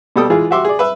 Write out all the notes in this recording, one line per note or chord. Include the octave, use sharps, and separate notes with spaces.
B2 G3 G4 A4 G5 D#6
E3 G#3 F4 G#4
F#4 G4 E5 C6 D6
G#4 D5
B4 E5